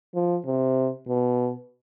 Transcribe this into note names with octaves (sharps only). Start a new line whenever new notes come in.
F3
C3
B2